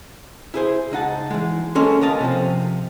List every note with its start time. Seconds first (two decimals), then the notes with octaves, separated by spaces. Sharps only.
0.54 E4 G#4 C5
0.91 C#2 D#4 F#5 A5
1.30 E3 G#3
1.75 G#3 A#3 C#4 A4 C6
2.01 D#2 A#4 D#5 A5
2.21 C3 F3